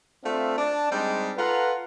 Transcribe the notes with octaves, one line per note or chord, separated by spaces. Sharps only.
A3 C4 D4 F4 E5 F5
D4 A5
G3 G#3 C4 D4 D#4 G4
F4 A4 B4 F5 F#5 A#5